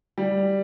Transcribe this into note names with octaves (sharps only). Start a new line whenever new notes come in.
G3